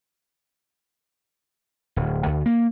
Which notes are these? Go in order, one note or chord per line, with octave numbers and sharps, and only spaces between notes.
D1
D2
A#3